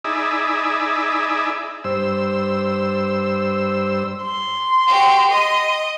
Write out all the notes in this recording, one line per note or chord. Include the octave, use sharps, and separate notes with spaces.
D#4 E4 G#4 D5 E5
G2 C5 E6
C6
F#4 G4
D#5